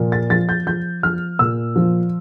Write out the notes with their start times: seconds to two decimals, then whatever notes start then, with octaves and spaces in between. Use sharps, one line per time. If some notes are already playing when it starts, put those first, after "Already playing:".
Already playing: A#2 F3
0.12 A6
0.30 F3 A6
0.49 G6
0.67 F3 G6
1.03 F3 F6
1.39 A#2 E6
1.76 F3